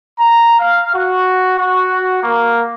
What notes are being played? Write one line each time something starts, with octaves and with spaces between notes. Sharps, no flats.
A#5
F5
F#4
F#4
A#3